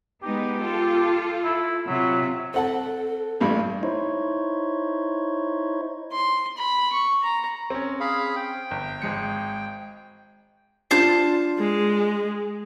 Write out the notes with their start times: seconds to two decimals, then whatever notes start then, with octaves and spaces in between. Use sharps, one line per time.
0.23 G#3 B3 D#4 G4
0.62 F4 A4
1.44 E4
1.87 C3 F#3 F4 E5
2.54 C4 A4 F#5 A5
3.40 A1 G2 G3
3.83 D#4 E4 C5 C#5
6.13 C6
6.58 B5
6.93 C#6
7.23 A#5
7.70 C4 C#4
8.00 G#4 F5 B5
8.36 G5
8.71 G1
9.02 G#1 G#3 C#7
10.91 D4 F4 C5 A5 G6
11.59 G#3